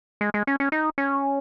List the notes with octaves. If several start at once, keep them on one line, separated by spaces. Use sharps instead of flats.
G#3
G#3
C#4
C#4
D#4
C#4